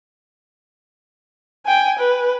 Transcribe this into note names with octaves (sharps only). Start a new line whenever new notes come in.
G5 G#5
B4